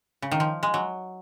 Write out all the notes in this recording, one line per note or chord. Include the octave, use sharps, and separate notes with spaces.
C#3
D#3
F3
G#3
F#3